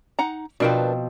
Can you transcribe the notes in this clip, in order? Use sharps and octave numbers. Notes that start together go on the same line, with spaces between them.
D#4 F#5 A#5
B2 F3 C4 D4 A#4 B4